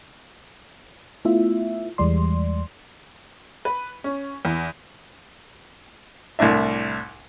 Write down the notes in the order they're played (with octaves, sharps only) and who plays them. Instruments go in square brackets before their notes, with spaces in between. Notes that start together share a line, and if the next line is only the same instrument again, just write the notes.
[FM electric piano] A3 B3 E4 F4 E5
E2 E3 G3 G#3 D5 C6
[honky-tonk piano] B4
C#4
E2
[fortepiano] C2 A2 D4 E5